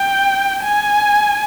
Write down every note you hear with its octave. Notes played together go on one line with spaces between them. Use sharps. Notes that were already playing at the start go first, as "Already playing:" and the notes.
Already playing: G5
G#5